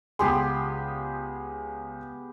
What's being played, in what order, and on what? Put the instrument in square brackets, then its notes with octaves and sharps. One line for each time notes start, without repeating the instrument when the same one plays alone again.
[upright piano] C#2 C6 [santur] B3 G4 G#4